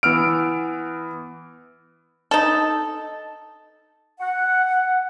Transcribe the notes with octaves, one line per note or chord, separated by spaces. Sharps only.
E3 B3 E6 F6 D7
D#4 A4
F#5